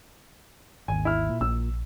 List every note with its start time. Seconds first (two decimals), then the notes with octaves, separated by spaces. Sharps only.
0.88 G#1 D#2 G#5
1.05 E4 F6
1.29 A#2
1.41 A#1 E6